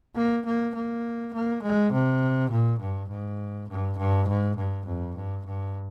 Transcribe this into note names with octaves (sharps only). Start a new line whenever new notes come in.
A#3
A#3
A#3
A#3
G#3
C3
A#2
G2
G#2
G2
G2
G#2
G2
F2
G2
G2